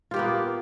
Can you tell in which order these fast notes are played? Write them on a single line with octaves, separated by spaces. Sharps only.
F4 G4 A#3 B3